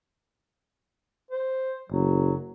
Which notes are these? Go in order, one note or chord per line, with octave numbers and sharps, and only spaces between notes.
C5
F#1 F#3